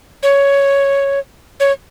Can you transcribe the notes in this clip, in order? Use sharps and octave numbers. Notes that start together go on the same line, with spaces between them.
C#5
C#5